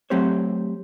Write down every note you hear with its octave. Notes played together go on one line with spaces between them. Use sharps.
F#3 A3 C4 G4 C5 C#5